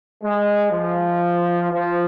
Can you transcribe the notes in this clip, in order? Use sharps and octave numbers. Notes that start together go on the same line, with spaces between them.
G#3
F3
F3